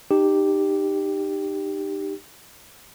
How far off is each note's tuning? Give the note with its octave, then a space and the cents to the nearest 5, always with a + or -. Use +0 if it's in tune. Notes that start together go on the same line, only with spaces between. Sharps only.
D#4 -30 G4 +0